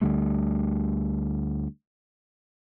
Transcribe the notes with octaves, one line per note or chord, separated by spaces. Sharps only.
D2 D3 G3 A3